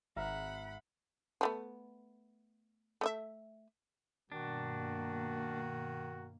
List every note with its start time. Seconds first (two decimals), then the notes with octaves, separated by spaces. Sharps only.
0.16 G#1 E5 F#5 A#5 B5 F6
1.41 F3 A3 B3
3.01 A3 D#5 E5
4.32 G2 B2 D#3 A#3 D4 F#4